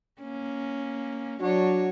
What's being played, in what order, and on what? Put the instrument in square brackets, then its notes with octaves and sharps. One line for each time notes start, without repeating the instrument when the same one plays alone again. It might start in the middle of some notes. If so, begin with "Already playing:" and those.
[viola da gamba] A#3 C#4
[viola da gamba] F#3 C#5 [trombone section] D4 F#4